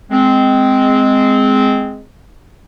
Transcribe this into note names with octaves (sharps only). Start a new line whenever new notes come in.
G#3 C4